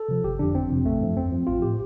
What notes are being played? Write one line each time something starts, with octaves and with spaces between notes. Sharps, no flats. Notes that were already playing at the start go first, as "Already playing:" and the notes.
Already playing: A4
C3 F3
G1 G4
F2 D3 F3 D4
G1 C4
F2 C3 F3
A1 A3
G2 F3
F2 C4
F3
A1 F4
A2 F3 G4